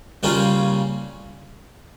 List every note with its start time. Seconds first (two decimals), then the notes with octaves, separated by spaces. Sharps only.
0.23 C#3 G3 A#3 C#4 F4